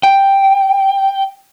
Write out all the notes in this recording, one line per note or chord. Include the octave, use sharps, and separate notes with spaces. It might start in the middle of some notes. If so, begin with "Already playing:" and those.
G5